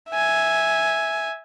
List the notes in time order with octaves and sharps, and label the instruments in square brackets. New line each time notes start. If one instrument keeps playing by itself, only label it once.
[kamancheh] E5 G#5